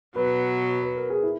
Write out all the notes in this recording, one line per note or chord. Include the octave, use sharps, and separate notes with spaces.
B2 F#3 B3 B4
B4
A#4
G#4
E4